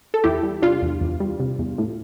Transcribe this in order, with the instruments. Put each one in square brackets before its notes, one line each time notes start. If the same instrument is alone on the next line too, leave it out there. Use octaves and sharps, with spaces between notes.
[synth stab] A4
E2 E4 G4
G3
C3 D4 F4
E2
E2
G3
C3
E2
A2